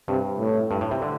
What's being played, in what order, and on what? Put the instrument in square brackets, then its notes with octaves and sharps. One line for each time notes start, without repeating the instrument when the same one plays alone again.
[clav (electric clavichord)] G2 [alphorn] C3
[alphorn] A2
[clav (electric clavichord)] G2
A2
C3
D3